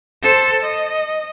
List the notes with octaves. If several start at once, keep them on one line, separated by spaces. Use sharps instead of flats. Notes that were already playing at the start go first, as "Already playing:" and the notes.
A4 C5
D#5